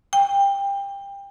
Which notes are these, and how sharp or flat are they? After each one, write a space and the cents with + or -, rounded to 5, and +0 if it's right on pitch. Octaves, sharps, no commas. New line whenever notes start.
G5 +25